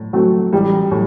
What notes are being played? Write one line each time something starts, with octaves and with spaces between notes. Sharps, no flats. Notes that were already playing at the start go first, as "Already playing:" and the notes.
Already playing: A2
F#3 A3 C4 F#4
A1 G3
A2